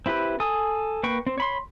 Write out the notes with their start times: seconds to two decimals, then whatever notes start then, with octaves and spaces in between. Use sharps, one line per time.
0.06 C4 E4 G4 B4
0.40 A4 G#5 D#6
1.03 A#3 B4 G5 C#6
1.27 C4
1.38 C#5 B5 C6